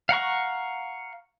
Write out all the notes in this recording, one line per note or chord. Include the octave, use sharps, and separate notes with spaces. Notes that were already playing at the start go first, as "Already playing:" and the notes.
F5 F#5 A#5 C#6